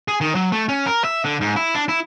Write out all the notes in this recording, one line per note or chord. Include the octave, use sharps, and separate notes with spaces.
G#4
D#3
F#3
A3
C#4
A#4
E5
D3
G#2
E4
D4
E4